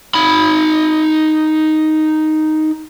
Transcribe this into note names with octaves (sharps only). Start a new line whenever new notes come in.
D#4 B5